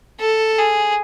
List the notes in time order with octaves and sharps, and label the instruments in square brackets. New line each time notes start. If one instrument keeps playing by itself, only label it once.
[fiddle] A4
G#4